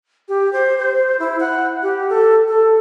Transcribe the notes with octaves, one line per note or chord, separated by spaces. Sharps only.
G4
C5
C5
E4
F#5
G4
A4
A4